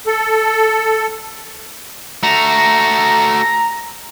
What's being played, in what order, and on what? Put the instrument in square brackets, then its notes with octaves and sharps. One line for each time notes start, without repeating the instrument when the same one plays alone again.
[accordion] A4
[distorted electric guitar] A3 F#4 [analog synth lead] A#5